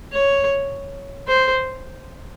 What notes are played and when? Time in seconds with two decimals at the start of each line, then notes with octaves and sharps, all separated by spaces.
0.12 C#5
1.27 C5